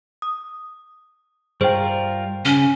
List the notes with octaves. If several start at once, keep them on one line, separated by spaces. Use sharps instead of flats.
D#6
G2 G3 F4 G#4 A#4 C5 G5
C#3 C#4